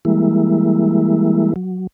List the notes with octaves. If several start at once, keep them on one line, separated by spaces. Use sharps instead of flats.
E3 G3 G#3 A#3 E4
F#3